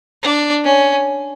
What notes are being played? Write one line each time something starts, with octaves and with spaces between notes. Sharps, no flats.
D4
C#4